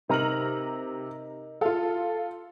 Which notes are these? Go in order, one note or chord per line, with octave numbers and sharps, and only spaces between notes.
C3 D#4 A#4 A#5 F#7
F4 A4 F5